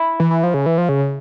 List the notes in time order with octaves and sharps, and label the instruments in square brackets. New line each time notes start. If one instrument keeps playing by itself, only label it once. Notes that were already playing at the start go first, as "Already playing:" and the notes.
Already playing: [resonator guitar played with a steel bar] E4
[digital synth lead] E3
E3
F3
C#3
E3
F3
C#3